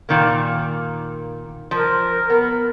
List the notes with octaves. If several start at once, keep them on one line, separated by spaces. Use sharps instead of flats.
A#2 D#3 A#3
F3 A#4
B3